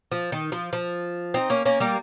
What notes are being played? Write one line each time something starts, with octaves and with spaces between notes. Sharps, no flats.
F3
D#3
F3
F3
C4 D#4
A#3 C#4
A#3 C#4
G3 A#3